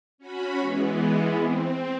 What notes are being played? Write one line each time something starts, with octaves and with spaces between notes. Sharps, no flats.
C#4 F#4 B5
E3 G#3 B3
C4